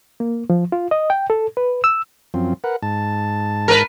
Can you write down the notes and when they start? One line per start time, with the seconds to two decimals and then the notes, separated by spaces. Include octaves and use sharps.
0.20 A#3
0.50 F3
0.72 F4
0.91 D#5
1.10 G5
1.30 A4
1.57 B4
1.84 E6
2.34 F#2 F3 C4
2.64 A#4 B4 F#5
2.82 G#2 A5
3.68 A#4 B4